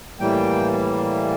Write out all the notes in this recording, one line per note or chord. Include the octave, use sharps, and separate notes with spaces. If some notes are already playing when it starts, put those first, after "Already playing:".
A2 E3 G3 A#3 G5